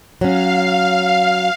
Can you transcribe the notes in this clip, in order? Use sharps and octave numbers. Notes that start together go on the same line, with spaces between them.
F#3 C#4 F5